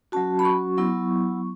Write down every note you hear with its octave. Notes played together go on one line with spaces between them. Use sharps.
F#3 C#4 F#4 A5
B5
C#6
F#3 B3 E4